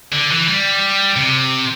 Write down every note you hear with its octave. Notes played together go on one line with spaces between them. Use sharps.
D3
E3
G3
C3